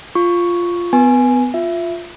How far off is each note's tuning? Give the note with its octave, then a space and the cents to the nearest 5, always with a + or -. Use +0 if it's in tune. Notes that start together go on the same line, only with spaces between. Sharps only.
F4 +0 C#6 +0
B3 +30 B4 -30 G#5 +0
F4 +5 E5 +15